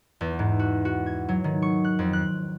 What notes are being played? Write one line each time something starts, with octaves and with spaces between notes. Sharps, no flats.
E2
G#2
F#4
F#4
G#6
F#3
D#3
C#6
F#6
F2
F#6